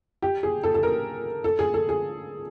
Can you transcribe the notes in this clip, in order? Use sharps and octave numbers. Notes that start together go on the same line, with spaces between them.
G4
G#4
A4
A4
A#4
A4
G#4
A4
G#4